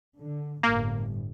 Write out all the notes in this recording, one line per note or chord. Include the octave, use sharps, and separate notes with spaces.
D3
G1 A2 A#3